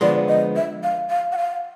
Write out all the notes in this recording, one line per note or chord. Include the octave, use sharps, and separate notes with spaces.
D3 F3 G#3 B3 D5
D#5
E5
F5
F5
F#5
F5